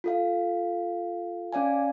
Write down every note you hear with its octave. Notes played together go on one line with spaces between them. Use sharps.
F4 A4 F5
C#4 D5 F5 G#5